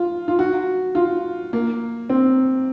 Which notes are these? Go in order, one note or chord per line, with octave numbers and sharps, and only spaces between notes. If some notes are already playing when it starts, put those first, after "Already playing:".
Already playing: F4
F4
F#4
F4
A#3
C4